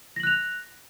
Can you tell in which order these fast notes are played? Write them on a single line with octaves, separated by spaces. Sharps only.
A#6 F#7 F#6 F7